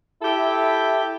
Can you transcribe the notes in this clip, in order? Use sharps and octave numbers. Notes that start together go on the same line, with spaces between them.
E4 G4 A4 E5